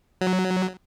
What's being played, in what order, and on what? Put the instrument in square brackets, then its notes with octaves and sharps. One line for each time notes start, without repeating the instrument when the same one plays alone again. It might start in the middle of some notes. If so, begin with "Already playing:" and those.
[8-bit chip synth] F#3